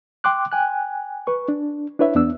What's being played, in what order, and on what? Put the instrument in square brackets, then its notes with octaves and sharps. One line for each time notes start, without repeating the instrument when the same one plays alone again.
[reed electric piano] G5 C6 D6 F#6
G5 G#5 F#6
B4 C#6
D4
D4 E4 B4 C#5 E5
E2 B3 D4 E6